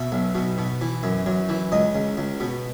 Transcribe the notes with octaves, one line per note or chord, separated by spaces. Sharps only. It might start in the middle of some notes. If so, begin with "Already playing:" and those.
Already playing: B2 E5
B1
B2
B2
E3
F#2
F#2
E3
C#2 D#5
C#2
C#2
B2